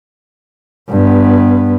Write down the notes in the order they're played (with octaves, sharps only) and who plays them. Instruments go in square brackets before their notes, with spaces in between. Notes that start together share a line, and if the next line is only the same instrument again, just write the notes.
[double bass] G2 B3